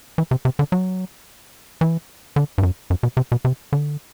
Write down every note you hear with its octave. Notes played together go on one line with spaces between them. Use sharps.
E3
C3
C3
D3
F#3
E3
D3
G2
F#2
F#2
B2
C3
B2
C3
D3